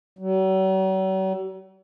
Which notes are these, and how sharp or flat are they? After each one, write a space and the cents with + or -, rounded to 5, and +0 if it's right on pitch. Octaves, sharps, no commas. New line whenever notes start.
F#3 +45